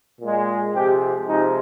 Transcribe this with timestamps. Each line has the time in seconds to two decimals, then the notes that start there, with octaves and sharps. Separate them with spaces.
0.20 A#2 G#3
0.72 C3 F3 G#3 G4
1.25 C3 F3 G#3 D#4